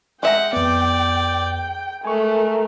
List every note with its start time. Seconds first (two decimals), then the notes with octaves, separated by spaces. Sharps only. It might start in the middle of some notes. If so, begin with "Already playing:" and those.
0.23 G#3 E5 F#5 G5 A#5
0.53 F2 B3 D5
2.05 G#3 A3 A#4 G#5 C#6